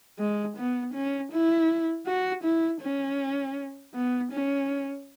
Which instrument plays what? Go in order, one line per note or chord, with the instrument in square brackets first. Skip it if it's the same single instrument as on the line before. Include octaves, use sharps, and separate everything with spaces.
[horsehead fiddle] G#3
B3
C#4
E4
F#4
E4
C#4
B3
C#4